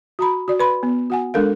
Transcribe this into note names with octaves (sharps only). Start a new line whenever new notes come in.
F#4 A#5 B5
F#4 D5
B4 B5 C6
B3
F#4 F#5 G#5
G#3 D4 A4 A#4 F5